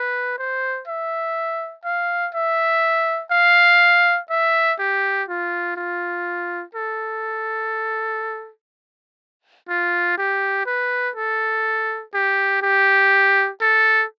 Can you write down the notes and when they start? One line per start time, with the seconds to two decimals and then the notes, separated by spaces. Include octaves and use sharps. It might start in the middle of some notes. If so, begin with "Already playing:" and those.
Already playing: B4
0.38 C5
0.88 E5
1.85 F5
2.35 E5
3.31 F5
4.30 E5
4.79 G4
5.28 F4
5.76 F4
6.75 A4
9.69 F4
10.18 G4
10.66 B4
11.16 A4
12.14 G4
12.62 G4
13.61 A4